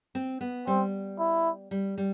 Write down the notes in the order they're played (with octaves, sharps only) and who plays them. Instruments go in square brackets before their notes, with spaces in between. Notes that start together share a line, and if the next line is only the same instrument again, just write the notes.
[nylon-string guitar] C4
B3
[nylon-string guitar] G3 [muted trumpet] C4
[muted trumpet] E4
[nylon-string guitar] G3
G3